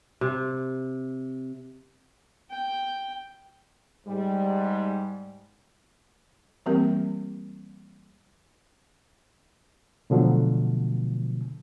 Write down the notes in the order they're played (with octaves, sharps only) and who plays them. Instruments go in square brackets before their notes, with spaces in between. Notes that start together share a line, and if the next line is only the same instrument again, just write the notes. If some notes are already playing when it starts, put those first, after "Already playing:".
[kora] C3
[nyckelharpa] G5
[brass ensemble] G#2 G3
[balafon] E3 G3 A#3 C4 G4 A#4
[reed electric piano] B2 D3 F3 F#3 A3